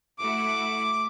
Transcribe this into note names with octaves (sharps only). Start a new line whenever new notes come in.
A3 E4 F#4 D6